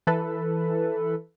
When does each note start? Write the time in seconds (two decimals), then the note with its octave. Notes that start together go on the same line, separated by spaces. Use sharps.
0.07 E3 A4 B4